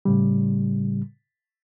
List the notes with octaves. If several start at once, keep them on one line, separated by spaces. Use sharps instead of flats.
A2 C#3 G3